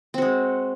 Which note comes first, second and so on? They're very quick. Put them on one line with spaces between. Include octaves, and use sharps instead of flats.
C4 F#4 G#3